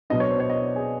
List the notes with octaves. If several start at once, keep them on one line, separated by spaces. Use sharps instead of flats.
B2 F#3 B3 D4 D#5
C#5
C5
C#5
D#5
D5
G#4